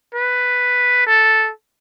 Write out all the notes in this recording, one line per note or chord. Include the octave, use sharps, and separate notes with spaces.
B4
A4